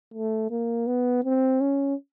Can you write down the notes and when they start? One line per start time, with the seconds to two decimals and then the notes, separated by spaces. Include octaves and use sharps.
0.14 A3
0.51 A#3
0.87 B3
1.24 C4
1.61 C#4